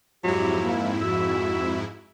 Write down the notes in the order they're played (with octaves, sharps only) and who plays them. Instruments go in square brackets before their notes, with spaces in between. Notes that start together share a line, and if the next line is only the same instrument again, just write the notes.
[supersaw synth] F2 G#2 E4 [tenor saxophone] F#3 [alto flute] G4
[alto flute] A#3
[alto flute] F#4 [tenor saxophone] E5